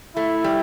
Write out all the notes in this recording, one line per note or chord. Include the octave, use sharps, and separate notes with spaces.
A3 E4
G3